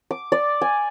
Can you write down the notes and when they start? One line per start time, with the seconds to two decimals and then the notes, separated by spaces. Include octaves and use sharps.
0.11 D6
0.32 D5
0.61 G#5